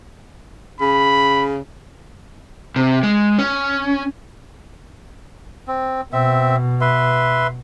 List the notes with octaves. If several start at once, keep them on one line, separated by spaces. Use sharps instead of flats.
C#3 B5
C3
G#3
C#4
C4
B2 C4 E5
B4 E5 C6